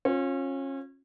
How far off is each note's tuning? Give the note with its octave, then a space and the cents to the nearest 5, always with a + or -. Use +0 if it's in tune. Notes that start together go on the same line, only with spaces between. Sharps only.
C#4 -30 F4 +30